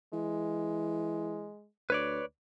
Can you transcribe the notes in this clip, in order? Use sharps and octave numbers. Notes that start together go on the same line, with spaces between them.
E3 G#3
D2 B4 C#5 D5